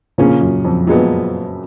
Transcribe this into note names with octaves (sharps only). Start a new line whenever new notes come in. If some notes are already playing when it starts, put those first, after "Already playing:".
A#2 C#3 F3 A#3 C#4 G#4
F#2
F2
F#2 A#2 G#3 B3